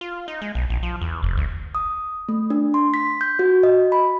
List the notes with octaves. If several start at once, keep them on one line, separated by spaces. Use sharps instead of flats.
F4
D#4
G#3
B1
A#1
F3
E2
F1
D2
D#6
A3
D4
C6
B6
G6
F#4
D#5
B5